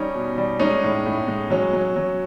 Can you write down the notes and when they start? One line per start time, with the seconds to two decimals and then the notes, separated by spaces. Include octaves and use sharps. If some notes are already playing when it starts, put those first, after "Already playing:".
Already playing: G3 C#4 D#4
0.15 B2
0.38 G3
0.59 G#3 C#4 D#4
0.83 A2
1.06 A2
1.28 G#3
1.50 F#3 C#4
1.73 F#3
1.96 F#3